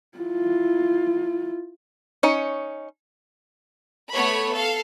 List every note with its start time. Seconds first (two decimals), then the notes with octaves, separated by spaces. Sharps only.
0.18 E4 F4
2.23 C#4 D#4 C#5
4.11 A3 B3 C#5 B5
4.52 A4 F5